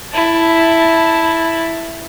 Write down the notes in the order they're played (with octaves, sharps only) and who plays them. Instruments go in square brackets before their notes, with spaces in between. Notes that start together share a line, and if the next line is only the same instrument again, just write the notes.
[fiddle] E4 A5